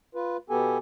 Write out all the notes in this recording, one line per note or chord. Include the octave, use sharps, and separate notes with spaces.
F4 B4
B2 B3 G4 A4 G#5